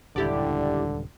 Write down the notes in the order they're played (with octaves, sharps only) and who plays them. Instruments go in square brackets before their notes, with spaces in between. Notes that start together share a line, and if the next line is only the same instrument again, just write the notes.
[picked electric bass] D#1 C#2 G2 [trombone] D3 [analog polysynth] E4 G4 D5